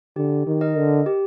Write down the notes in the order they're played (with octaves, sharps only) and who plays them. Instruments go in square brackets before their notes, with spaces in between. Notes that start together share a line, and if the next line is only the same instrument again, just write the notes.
[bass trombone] D3 [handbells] G4
[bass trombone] D#3
[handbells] A#4 D#5
[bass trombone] D3
[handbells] G4